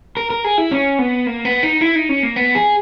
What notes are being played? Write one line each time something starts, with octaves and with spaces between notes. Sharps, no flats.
A#4
A#4
G#4
E4
C#4
B3
A#3
B3
D#4
E4
D#4
C#4
A#3
B3
G#4